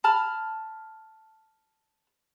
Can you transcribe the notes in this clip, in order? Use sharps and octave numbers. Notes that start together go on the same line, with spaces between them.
A5 B5 F6